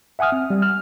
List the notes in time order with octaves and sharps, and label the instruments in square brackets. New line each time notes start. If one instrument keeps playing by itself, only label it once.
[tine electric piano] E5 F#5 G#5 D#6 F6
C4
G3
F6